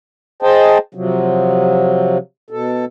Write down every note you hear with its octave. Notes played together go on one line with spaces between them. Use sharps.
G#4 C5 D#5 G5 A5
C3 F3 F#3
B2 A4